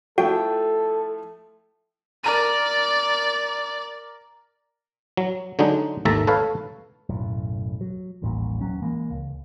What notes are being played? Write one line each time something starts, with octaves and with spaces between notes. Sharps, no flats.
F3 A3 E4 F#4 A4 G5
A#4 D5 A#5 D#7
F#3
D3 F#3 G#3 D4 D#4
G#1 D#2 A3 E5 A5 A#5
A4 B4 C#5 F5
B1 F#2 A2
F#3
D#1 A1 G2 A#2
D#1 F#3 C#4
A#2 E3 G#3 A#3
C#2